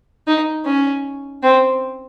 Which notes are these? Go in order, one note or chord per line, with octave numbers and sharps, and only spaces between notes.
D#4
C#4
C4